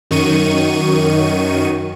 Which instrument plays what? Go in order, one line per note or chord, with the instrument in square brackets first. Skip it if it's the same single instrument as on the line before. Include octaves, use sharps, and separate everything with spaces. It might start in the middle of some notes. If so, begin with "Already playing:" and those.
[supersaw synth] F#2 D#3 C#6 D#7